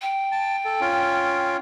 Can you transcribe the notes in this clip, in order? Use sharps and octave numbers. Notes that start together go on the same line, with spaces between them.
G5
A5
A4
C#4 F4